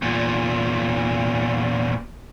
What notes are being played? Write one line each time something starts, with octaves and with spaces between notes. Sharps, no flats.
E2 A#2